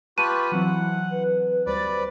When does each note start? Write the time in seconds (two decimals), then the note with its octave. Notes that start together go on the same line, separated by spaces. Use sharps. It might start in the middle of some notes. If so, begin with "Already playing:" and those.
0.18 F4 G4 B4 A5 C#6 F#6 D#7
0.52 E3 F#3 C4 E4 F#5
1.11 B4
1.66 D2 G3 B4 C5 D5 A6